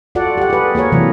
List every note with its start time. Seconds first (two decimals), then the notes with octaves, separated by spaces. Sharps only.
0.15 F4 F#4 A4 D5 F#5
0.38 G4 F#5
0.50 G#4 B4
0.75 A#3 G#4 A#4 C#5
0.92 C3 E3 F#3 B4